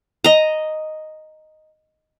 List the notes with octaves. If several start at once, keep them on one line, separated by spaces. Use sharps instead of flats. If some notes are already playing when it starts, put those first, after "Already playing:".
D#5 A#5